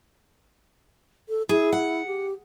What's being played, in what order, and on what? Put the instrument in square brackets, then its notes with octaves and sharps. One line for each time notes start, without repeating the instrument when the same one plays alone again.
[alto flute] A4
[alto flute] E4 [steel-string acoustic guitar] G#4
[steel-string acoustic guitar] F#5
[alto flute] G4